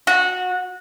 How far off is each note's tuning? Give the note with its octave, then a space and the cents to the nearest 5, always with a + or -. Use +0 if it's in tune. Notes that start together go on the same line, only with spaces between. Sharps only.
F#4 -20